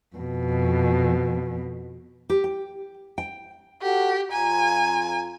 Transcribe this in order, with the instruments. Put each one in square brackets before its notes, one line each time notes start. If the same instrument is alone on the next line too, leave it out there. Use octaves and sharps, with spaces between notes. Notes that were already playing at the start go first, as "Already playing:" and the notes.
[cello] F2 B2
[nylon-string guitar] G4
G5
G5
[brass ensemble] F#4 A4 F#5 [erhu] G4
[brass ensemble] F2 F4 A#5 [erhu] G#5